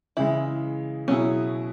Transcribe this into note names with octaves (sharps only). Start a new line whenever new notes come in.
C#3 E3 G#3 E4
B2 F#3 C#4 E4 G#4